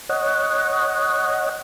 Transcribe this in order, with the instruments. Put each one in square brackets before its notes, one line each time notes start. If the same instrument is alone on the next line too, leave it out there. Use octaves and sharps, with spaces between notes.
[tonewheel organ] C#5 D#5 F#5